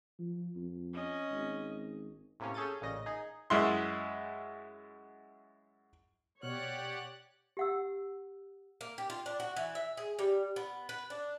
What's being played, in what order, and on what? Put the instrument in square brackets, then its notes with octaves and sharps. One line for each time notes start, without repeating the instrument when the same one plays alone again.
[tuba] F3
F2
[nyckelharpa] C#4 D#5
[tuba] G#1
[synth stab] A2 C3 A#3 C#4
C#4 G#4 A4 G6 A6 D#7
A1 A#2 C#3 D#5 A#6
D#4 G#4 D#5
[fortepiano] F#2 G#3 E4 C6
[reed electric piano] B2 F6 [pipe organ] G4 D5 F#5 [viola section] C#5 [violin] F#6
[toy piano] G4 F#5 E6
[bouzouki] A#3
G4
F4
D4
F#4
E3
E5
G#4
G3
B3
B4
D4